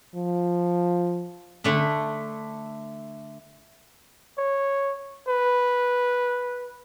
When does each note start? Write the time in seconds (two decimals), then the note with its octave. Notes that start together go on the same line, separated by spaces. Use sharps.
0.16 F3
1.64 D3 A3 D4
4.38 C#5
5.28 B4